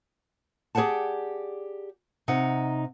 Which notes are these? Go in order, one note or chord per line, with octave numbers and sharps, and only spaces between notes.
G4 G#4 B4 D5 F#5 A5
C3 D#4 F#5